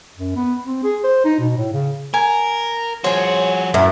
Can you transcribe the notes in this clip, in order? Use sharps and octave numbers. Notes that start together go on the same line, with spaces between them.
F#2
B3
C4
G#4
C5
D#4
B2
A2
C#3
A#4 G#5
F3 F#4 G#4 C5 C#5
F#2 E4